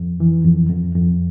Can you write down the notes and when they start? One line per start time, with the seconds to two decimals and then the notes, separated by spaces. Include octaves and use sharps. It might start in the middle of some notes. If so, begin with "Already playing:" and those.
Already playing: F2
0.20 E3
0.44 F2
0.69 F2
0.95 F2